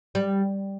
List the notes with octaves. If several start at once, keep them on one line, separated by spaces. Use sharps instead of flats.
G3